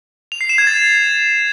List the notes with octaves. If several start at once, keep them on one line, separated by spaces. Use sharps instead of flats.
F7
C7
E7
G#6
A6